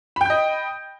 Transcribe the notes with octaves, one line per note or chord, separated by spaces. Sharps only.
D#5 G5 B5 G6